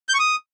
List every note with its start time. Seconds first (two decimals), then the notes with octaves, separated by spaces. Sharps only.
0.09 G6
0.14 C#6
0.19 D#6